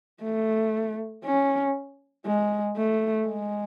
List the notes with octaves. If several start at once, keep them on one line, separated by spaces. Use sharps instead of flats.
A3
C#4
G#3
A3
G#3